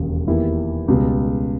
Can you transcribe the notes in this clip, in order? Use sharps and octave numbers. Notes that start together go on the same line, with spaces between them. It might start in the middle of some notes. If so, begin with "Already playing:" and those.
Already playing: E1 D#2 C#3
E2 D#3 A#3 E4 G4
C#2 B2 G3